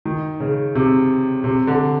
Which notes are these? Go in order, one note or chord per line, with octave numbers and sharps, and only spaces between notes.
D#3
C#3
C3
C3
D3